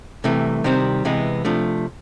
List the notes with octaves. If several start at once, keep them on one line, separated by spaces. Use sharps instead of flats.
C2 C3 E3 A3
C3 D#3 G3 C4
C3 E3 G#3 B3
C3 F3 A3 D4